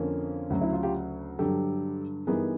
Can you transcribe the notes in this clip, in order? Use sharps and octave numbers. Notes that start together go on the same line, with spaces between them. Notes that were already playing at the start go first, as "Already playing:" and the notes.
Already playing: F2 D3 F3 A#3 C#4
D2 C#3 F#3
E4
F4
F4 G4
G2 D3 F#3 G4 A4
G2 E3 G3 B3 D#4 G#4 A#4